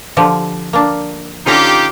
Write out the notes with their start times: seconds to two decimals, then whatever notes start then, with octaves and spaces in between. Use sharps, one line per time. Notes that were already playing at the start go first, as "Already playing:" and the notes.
0.17 D3 F3 G4
0.73 A#3 D4
1.46 D3 C#4 D#4 F4 G4 A#5